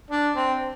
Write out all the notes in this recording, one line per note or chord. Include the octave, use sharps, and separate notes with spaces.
D4
C4